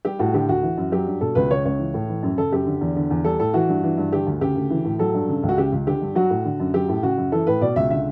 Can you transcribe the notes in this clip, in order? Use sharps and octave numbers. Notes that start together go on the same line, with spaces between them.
G3 G4
A2 F#4
D3 G4
D2 F#4
E3
F#2
F#3 G4
G2
B2 A4
C#2 B4
C#3 C#5
C#2 C#5
E3
A2
E3
F#2
C#3 A4
F#2 G4
D3
E2
D3
E2
G3 A4
A2 A4
E3 F#4
G2
E3
G2
D3 G4
D2
C#3 G4
D2
E3
A2
F#3 A4
G2
C#3
C#2
F#4
C#3 G4
C#2
D3 G4
G2
F#3 F#4
A2
D3
F#2
F#3 G4
A2
C#3 F#4
F#2
E3 A4
A2 B4
B2 D5
C#2 E5
D3 E5